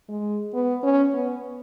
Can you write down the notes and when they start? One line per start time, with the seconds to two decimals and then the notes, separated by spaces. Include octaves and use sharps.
0.09 G#3
0.54 B3
0.83 C#4
1.13 B3